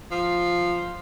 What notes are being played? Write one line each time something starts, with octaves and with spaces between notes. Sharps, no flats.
F3